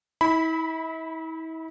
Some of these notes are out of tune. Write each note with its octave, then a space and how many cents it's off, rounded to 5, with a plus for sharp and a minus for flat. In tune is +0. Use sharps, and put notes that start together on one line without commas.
E4 -40 B5 +0